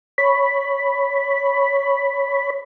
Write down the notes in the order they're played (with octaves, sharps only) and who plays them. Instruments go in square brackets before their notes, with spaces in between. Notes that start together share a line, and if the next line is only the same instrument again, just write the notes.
[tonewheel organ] C#5 B5